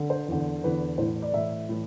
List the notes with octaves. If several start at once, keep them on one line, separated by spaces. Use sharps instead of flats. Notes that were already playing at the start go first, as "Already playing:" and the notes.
Already playing: D3
C5
E2 D3
E2 D3 B4
A2 E3 C5
D5
A2 E3 E5
A2 E3